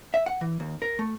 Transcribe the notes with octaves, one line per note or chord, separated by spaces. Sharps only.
E5
F#5
E3
D#2
A#4
A3